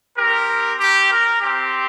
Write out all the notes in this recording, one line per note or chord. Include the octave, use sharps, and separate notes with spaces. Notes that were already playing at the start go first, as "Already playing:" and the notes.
C4 G4 A#4
G4
A#4
C4 G4